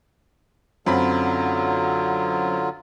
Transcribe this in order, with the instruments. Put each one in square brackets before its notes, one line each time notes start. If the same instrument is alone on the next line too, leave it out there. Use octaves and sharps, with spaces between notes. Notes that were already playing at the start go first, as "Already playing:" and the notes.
[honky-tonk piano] F#2 C4 B5 [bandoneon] D3 F#3 F4